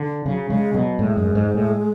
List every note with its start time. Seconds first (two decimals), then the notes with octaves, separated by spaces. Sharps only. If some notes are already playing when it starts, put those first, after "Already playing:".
Already playing: D3
0.26 C#3 F#3
0.50 C#3 G#3
0.75 B2 F#3
0.99 A2 G#3
1.17 F#2
1.35 G#2
1.54 A2